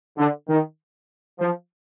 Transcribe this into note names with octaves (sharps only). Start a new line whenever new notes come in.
D3
D#3
F3